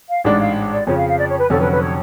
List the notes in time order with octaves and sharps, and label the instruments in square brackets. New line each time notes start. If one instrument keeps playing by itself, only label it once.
[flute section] F5
[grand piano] A1 G#2 G#3 D4 [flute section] D5
[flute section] F5
D5
[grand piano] F2 C#3 F3 [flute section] C#5
[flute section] F5
F5
D5
C#5
B4
[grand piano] F1 F2 D3 F#3 C#4 [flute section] A4
[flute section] B4
B4
C#5